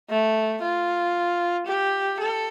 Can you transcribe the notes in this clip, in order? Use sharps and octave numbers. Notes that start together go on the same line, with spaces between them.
A3
F4
G4
A4